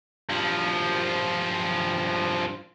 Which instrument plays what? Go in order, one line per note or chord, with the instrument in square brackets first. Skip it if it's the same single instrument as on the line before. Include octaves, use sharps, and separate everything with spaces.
[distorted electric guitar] G2 F3